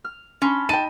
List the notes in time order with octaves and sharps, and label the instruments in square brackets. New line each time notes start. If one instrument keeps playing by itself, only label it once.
[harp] F6
[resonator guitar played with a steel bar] C#4 [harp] A5 B5 C6
[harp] D#4 [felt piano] G5 D#7 [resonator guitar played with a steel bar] A5